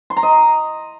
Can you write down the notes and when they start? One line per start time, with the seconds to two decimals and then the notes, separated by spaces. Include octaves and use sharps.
0.10 C6
0.17 A#5
0.23 D#5